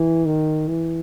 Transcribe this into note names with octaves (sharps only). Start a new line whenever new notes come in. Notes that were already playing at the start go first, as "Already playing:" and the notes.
Already playing: E3
D#3
E3